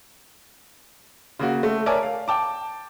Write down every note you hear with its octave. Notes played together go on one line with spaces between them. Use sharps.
C#3 A#3 F#4
A3
A#4 C#5 D5 E5 G#5 A5
F5
G5 A5 D6